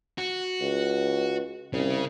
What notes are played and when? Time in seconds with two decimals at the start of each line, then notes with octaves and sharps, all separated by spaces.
0.18 F#4
0.61 C#2
1.73 C2 C#3